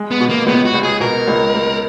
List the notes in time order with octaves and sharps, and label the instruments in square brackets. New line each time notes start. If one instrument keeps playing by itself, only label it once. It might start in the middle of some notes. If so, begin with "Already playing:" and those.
Already playing: [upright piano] G#3
[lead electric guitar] B3
[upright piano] B2
[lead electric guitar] A#3
[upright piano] C#2 [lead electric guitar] B3
[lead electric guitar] F#4
[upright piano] C#2
[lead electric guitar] G#4
[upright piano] B2 [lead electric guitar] A#4
[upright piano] C#2
C#2